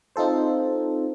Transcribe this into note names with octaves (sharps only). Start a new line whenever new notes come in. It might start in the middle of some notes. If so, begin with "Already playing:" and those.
C4 D#4 F4 A4 C5